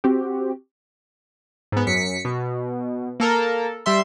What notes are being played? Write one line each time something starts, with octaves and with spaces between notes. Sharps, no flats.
C4 F#4 G4
G#2 B3
F#2 B6 C#7
B2
A#3 A4 A#4
G3 E5 C6